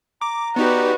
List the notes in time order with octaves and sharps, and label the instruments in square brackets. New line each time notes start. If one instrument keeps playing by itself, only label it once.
[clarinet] A#5 [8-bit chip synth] D6
[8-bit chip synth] B3 D#4 G4 [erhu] F#4 [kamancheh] B4 D5